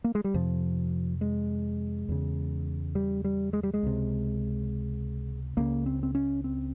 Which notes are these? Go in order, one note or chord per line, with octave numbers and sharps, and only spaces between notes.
A#3
G#3
G3
F2 C3 F3
G#3
E2 C#3
G3
G3
G#3
G3
G#3
C#2 C3
C#2 C#3 A#3
C4
C4
C#4
C4